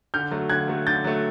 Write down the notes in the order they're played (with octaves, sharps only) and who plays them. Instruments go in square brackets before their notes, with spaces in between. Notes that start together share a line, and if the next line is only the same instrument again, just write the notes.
[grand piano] D3 F6 G6
F#3 A3
D3 F#6 G#6
F#3 A3
D3 G6 A6
F#3 A3